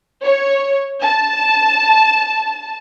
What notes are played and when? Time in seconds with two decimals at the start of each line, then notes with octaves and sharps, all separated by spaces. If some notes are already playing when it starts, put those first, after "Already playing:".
0.23 C#5
1.03 A5